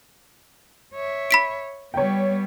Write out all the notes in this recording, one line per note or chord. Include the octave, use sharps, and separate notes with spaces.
C#5 E5
B5 B6 D7
G3 B3 C#5 G5